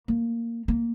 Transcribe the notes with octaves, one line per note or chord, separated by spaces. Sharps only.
A#3
A#3